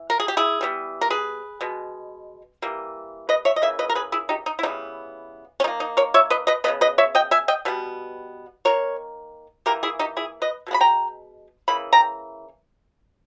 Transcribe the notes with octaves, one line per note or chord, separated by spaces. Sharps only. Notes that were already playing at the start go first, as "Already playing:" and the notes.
Already playing: E3
A#4
G#4
G4
E4 G#4
E3 G3 B3
A#4
G#4 B4
B2 G#3 B3
E3 G3 A#3
B4 D#5
C#5 E5
D#5
C#3 E3 A#3 E5
B4 D#5
A#4
G#4 B4
E4 G#4
D#4 G4
D#4
E4
C#3 E3 G3 B3 D#4
C#4
D#3 A#3 D#4
D#4
A#4 C#5
C#5 E5
B4 D#5
B4 D#5
C#3 G#3 B3 B4 D#5
B4 D#5
C#5 E5
D#5 G5
E5 G#5
D#5 G5
B2 G3 B3
D#3 A#3 A#4 C#5
E3 A#3 G4 A#4
E4 G#4
D#4 G4
E4 G#4
B4 D#5
B2 G#3 B3
B5
G5 A#5
C#3 E3 A#3 B5
G5 A#5